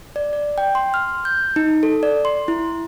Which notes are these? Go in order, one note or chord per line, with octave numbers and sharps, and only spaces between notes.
D5
D5
G5
C6
F6
G6
D#4
A4
D5
C6
E4